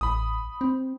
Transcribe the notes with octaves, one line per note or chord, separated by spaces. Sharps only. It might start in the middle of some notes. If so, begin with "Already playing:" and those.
A1 B5 D#6
C4